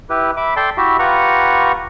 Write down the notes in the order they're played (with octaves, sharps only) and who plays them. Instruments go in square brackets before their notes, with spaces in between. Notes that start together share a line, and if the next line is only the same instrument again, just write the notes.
[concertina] E4 G4 B4
E5 B5 D6
A4 D5 G5 A5 C6
E4 F#4 G4 E5
F4 G4 B4 F#5 A#5 C#6